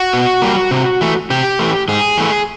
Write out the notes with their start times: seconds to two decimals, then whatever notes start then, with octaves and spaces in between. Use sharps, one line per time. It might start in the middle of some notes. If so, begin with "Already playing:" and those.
Already playing: F#4
0.13 B2
0.42 G3 A#3
0.71 C3
1.01 E3 A3
1.30 C3 G4
1.59 E3 A3
1.88 G#2 G#4
2.18 E3 A3